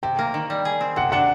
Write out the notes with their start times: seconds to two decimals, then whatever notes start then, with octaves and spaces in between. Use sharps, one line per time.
0.03 C3 G5
0.19 A#3
0.34 D#3
0.50 G3
0.65 G#4
0.81 C4
0.96 C3 F#5
1.12 D4 F#5